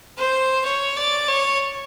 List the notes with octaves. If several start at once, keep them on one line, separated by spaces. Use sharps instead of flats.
C5
C#5
D5
C#5